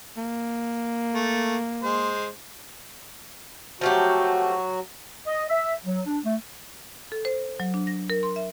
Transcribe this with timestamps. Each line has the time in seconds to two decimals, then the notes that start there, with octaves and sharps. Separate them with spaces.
0.17 A#3
1.14 A3
1.83 G#3 C5
3.81 F3 F#3 A3 F#4 G4
5.27 D#5
5.49 E5
5.85 F#3
6.05 D4
6.24 A3
7.12 A4
7.25 C5
7.60 F#3
7.74 D4
7.87 A#6
8.10 A#4
8.23 C6
8.36 E5